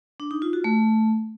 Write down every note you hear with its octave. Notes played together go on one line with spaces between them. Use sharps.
D4
D#4
F4
F#4
A3